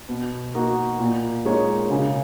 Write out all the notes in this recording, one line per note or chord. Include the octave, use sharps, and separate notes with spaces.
B2
A#3 D#4 F#4
A#2
G#3 D#4 A#4 C#5
C#3